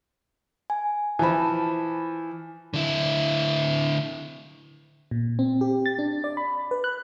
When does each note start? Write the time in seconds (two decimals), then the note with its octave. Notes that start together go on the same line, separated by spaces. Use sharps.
0.70 G#5
1.19 E3 F3 A5 B5
2.74 D3 E4
5.11 A#2
5.39 C4
5.61 G4
5.86 A6
5.99 D4
6.24 D5
6.37 B5
6.71 B4
6.84 F#6